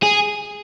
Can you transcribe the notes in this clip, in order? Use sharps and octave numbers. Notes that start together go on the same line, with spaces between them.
G#4